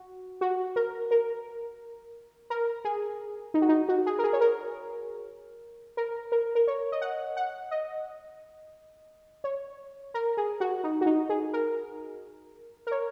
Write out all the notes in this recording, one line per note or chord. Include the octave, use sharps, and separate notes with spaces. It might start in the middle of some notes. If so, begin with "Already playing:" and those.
Already playing: F#4
F#4
A#4
A#4
A#4
G#4
D#4
F#4
D#4
F#4
G#4
A#4
G#4
C#5
A#4
A#4
A#4
A#4
C#5
D#5
F#5
F#5
D#5
C#5
A#4
G#4
F#4
D#4
F#4
D#4
G#4
A#4
A#4
C#5